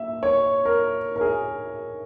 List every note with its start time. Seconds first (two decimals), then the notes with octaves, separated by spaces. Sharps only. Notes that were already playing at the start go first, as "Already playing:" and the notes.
Already playing: A#3 E5
0.23 C#5
0.65 A#4
1.16 A#4
1.21 G#4